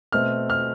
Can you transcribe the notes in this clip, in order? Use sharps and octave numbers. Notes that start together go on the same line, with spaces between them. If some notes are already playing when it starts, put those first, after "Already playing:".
B2 A3 C4 F6
F6